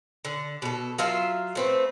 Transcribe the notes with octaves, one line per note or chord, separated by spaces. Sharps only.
D3
B2 A4
F#3 F4 E5 F5
A3 C4 B4